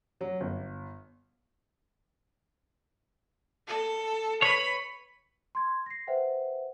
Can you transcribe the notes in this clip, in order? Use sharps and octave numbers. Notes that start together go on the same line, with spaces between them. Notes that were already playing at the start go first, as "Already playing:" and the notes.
F#3
G1
A4
B4 C#5 B5
C6 G#6
A#6 C7
B4 C5 E5 F#5 G5